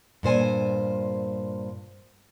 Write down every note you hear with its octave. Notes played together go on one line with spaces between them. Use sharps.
G2 A#2 C5 G#5